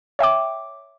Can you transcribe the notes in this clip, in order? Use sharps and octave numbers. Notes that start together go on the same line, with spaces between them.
C#5 E5 G5 D6